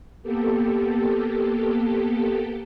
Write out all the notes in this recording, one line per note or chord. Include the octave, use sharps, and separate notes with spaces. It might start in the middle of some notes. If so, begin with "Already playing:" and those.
A#3 B3 G4 A4